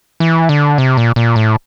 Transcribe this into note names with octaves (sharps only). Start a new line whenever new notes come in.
E3
D3
C3
A#2
A#2
A2